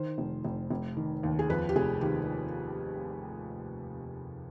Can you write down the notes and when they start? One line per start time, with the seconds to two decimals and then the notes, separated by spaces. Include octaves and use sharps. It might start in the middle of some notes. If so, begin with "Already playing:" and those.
Already playing: D#3 C5
0.18 F1
0.45 F1
0.70 F1
0.97 D#3
1.23 D#2
1.39 G#4
1.49 F2 B4
1.69 G4
1.76 F1 G#4
2.01 D#3 G4